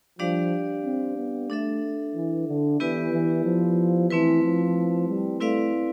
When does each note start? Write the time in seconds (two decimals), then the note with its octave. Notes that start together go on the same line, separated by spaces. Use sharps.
0.19 F3 G3 D4 G4 D5 F5
0.84 C4
1.17 B3
1.50 A3 D4 A4 E5
2.15 E3
2.47 D3
2.80 E3 B3 E4 G4 B4 D5
3.12 E3
3.44 F3
4.10 E3 A3 C4 E4 B4
4.42 F3
5.08 G3
5.40 A3 C4 E4 B4 D5 F5